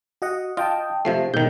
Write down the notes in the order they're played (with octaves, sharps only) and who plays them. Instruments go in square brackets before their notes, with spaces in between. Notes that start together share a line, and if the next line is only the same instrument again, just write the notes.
[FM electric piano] F#4 D#5 F#5
[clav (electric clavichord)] F4 [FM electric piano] D#5 G5 A5
[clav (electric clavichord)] C3 F3 A3 [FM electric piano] C7
[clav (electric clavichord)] G#2 D#3 [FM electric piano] B2 G6